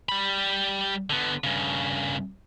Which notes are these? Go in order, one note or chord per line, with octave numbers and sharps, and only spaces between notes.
G3 B5
D3 B3
G2 C#3